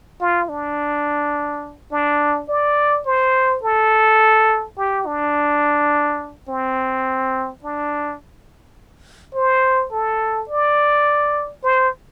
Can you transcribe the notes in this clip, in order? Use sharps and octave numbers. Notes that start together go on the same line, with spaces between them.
F4
D4
D4
D5
C5
A4
G4
D4
C4
D4
C5
A4
D5
C5